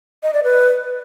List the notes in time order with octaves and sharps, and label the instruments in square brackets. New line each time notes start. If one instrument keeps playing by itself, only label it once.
[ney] D#5
D5
B4